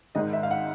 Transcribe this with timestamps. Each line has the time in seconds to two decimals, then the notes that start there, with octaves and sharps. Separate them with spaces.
0.15 G#1 G#2 D#3 D#5
0.33 E5
0.43 F5
0.51 F#5